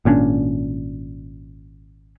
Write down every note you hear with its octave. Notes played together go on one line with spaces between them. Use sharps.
G#1 A#2 C#4 D4